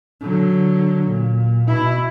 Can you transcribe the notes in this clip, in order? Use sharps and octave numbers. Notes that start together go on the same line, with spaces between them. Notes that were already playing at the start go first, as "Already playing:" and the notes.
D3 F#3
A#2
B2 E4